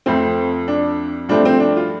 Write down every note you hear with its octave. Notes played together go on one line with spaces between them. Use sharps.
F2 F3 A3 C4
D4
G2 F3 A3 C4 D4
C4
D4
F4